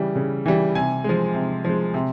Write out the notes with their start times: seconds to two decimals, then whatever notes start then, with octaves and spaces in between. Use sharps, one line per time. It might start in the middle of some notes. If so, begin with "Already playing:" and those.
Already playing: C#3 E3 G3
0.16 C#3
0.46 E3 G3
0.75 C3 G#5
1.04 F3 G#3
1.34 C3
1.65 F3 G#3
1.94 C3